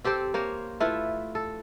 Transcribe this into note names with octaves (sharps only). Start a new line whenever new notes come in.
C4 G4 A4 C5
A#3 C5 C#5
A3 E4 F4 B4
A4